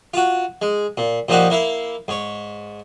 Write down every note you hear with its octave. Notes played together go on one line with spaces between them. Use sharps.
F4 F#4
G#3
A#2
A#2 F3 A#3 D#4 F#4 G4
A#3 E4 F5
G#2 C#5